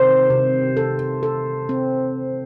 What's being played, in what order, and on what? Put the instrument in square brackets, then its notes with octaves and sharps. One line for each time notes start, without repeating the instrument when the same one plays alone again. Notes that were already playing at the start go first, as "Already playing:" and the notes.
Already playing: [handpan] C3 D#3 [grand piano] C5
[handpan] C3
A4
A4
C4